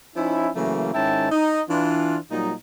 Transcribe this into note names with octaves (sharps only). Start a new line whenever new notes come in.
F3 C#4 D#4 E4
C#3 E3 F#3 A3 A#3
G#2 D#3 C#4 E4 G5 A5
D#4 D#5
E3 D4 F4
A#2 F#3 G3 D#4